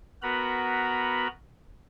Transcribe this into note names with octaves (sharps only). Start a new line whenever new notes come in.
B3 F#4 A#4 B4 A#5 B5